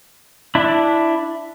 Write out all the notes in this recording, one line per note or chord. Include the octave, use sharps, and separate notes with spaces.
D4 E4